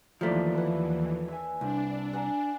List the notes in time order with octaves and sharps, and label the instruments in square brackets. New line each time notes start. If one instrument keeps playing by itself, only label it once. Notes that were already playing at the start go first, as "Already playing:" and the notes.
[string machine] D#2 E3 [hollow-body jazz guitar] F3 A3 [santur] D#4 A4 D5
[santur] E4 B4 F#5
E5 G#5
[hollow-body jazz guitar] C2 [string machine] D4
[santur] F#5 G#5 A#5